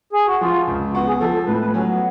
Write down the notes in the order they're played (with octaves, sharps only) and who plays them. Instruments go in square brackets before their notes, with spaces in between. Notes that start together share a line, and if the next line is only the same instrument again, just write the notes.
[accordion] G#4
F#4
[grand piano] F3 [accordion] F4
[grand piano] C#2
[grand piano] B3 [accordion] F#4
[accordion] G#4
[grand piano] F3 [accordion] A4
[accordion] A4
[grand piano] A2 [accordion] B4
[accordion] B4
[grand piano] F#3 [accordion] C#4
[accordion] B3